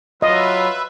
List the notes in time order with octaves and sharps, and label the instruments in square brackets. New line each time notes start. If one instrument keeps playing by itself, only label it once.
[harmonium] F#3 [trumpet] F4 [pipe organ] B4 E5 [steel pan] D#5